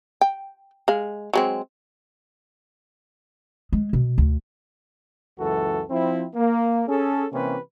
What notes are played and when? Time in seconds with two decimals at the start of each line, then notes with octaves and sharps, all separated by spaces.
0.21 G5
0.88 G#3 F5
1.34 F#3 G#3 C4
3.73 G#3
3.93 B2
4.18 D2
5.40 C#2 F#2 E3 F#4 A4
5.90 F3 C4 E4
6.35 A#3
6.88 C#4 G#4 A4
7.32 C3 E3 A#3 C#4 G4 B4